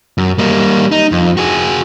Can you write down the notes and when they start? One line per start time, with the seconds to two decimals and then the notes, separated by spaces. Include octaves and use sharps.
0.18 F#2
0.38 G3 A#3
0.92 D#4
1.12 F2
1.37 F#4 G#4